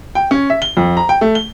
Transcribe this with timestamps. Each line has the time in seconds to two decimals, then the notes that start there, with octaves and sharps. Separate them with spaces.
0.15 G5
0.31 C#4
0.50 E5
0.62 G7
0.77 F2
0.97 A#5
1.09 G5
1.21 A3
1.35 G7